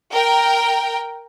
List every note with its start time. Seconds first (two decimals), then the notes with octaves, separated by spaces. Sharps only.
0.14 A#4 G5